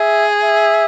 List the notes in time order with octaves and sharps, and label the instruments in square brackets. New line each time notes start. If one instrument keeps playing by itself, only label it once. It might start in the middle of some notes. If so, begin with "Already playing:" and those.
Already playing: [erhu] G#4 [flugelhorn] E5
[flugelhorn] E5